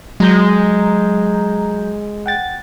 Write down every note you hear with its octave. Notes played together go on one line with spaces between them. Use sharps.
F#3 G#3 A#5 G6
F#5 G5 A6